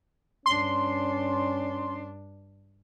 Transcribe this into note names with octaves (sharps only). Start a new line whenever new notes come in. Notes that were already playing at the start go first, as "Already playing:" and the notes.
G2 C#4 D4 C6